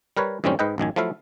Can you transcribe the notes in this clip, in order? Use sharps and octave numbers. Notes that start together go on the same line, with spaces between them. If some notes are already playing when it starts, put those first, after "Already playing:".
G3 A#4 B4 C#5
F#2 A2 D#3 G3 C4 C#4
G#2 B4 D#5 G5
A1 F#2 D#3 G#5
F3 F#3 A3 E4 E5 F5